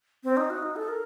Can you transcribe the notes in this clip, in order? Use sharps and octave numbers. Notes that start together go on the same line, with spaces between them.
C4
D#4
F#4
D#4
A4
A#4